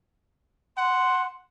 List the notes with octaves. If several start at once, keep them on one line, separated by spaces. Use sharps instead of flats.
F#5 C6